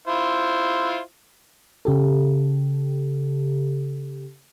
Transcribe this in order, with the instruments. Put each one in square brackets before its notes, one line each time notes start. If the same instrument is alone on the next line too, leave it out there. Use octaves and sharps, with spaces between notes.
[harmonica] E4 F4 C5
[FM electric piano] C#3 G4 A4